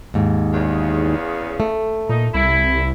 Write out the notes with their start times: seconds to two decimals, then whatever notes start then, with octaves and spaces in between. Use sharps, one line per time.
0.14 D#2 G#2
0.53 E2 C#3
1.60 A3
2.09 A#2 D#4
2.34 C2 E4